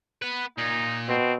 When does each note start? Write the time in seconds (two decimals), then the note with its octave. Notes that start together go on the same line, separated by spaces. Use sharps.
0.22 B3 B4
0.58 A#2 D#4
1.09 B2 C4